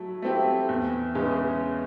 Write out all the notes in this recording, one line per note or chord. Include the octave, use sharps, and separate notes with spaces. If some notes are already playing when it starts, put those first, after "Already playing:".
Already playing: F#3 A3 E4
A3 C4 E4 G4
E2
C#3 E3 G#3 C#4